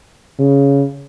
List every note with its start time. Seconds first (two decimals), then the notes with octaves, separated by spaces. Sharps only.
0.39 C#3